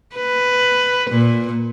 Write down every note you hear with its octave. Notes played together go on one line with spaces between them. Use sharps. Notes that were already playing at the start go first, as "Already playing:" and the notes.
B4
A#2